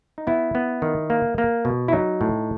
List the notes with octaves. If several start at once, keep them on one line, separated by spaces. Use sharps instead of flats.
D#4
B3 E4
B3
D#3
A#3
A#3
B2
E4
F#3 D#4
A2